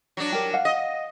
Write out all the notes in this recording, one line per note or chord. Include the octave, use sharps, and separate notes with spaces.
F#3 D4
G4 A#4
F5 F#5
D#5